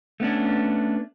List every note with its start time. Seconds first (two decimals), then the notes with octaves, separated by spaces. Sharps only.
0.20 A3 B3 C#4 D4